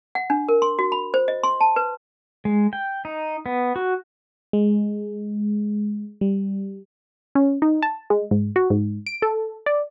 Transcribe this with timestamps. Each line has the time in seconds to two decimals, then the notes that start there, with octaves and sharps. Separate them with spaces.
0.15 F#5
0.30 D4
0.49 A#4
0.62 C6
0.79 F#4
0.92 B5
1.14 C5
1.28 D#5
1.43 C6
1.61 A5
1.76 B4
2.45 G#3
2.73 G5
3.05 D#4
3.46 B3
3.76 F#4
4.53 G#3
6.21 G3
7.35 C#4
7.62 D#4
7.82 A5
8.10 G#3
8.31 G#2
8.56 F#4
8.70 G#2
9.07 D7
9.22 A4
9.66 D5